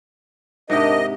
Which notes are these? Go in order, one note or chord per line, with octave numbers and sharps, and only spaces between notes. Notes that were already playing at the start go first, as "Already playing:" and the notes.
G#2 C3 D4 G4 A#4 D#5